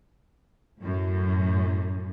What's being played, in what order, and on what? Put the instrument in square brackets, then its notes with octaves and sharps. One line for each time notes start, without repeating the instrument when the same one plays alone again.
[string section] F#2 A2